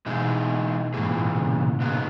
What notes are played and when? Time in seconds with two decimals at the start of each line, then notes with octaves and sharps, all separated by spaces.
0.06 B2 E3 G#3 D#4 G#4
0.94 G#2 E3 A#3 E4 G#4
1.10 A#2
1.25 B2
1.37 C#3
1.80 A#2 F#3 B3 D#4 G#4